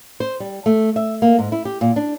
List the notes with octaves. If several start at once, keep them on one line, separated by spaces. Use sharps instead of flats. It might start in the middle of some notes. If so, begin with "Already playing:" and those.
C5
G3
A3
E5
A#3
G#2
E4
G4
A#2
D4